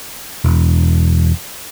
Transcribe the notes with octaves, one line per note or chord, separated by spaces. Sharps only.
E1